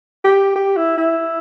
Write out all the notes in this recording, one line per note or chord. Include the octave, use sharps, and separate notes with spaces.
G4
G4
E4
E4